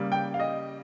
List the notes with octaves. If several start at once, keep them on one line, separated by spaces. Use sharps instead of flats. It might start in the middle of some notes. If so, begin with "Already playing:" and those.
Already playing: C#3 G3 A#3
G5
F5
D#5